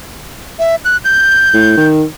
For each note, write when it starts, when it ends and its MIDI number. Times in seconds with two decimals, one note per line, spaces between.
0.59 0.76 76
0.85 0.97 90
1.04 1.86 91
1.54 1.74 45
1.77 2.04 51